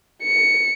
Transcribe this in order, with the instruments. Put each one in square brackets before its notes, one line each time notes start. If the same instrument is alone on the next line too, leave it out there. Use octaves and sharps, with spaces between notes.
[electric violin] C#7